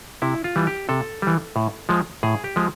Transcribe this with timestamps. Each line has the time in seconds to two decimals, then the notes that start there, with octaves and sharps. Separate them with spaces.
0.22 C3 E4
0.44 F4
0.56 E3 G3
0.67 G4
0.89 C3 A4
1.22 E3 G3
1.56 A2
1.89 F3 G#3
2.23 A2 G#4
2.44 G4
2.56 F3 G#3